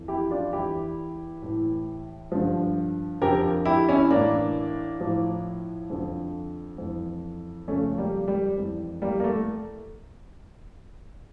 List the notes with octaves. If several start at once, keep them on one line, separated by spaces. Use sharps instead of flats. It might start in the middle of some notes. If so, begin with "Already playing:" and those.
Already playing: F2 E3
E4 G4
D4 F4
E2 E3 E4 G4
A2 E3
G2 D3 F3
F2 D3 F3 G4 A#4
E4 G4
C#4 E4
A2 E3 A#3 D4
A2 F3
F2 D3 F3
F2 E3
F2 C#3 F3 A3 C#4
G3 A#3
G3
F2 E3
G3 A#3
A#3
A3